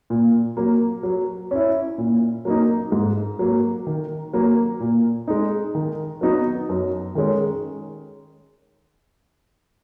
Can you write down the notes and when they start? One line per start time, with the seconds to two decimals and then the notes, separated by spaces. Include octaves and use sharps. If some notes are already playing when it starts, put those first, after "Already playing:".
0.10 A#2
0.57 F#3 A#3
1.03 F#3
1.51 C#4 E4
1.98 A#2
2.45 F#3 A#3 D#4
2.92 G#2
3.39 F#3 A#3
3.87 D#3
4.33 F#3 A#3
4.80 A#2
5.28 G#3 D#4
5.75 D#3
6.21 F#3 B3 D#4 F#4
6.69 F#2
7.15 D#3 G#3 C#4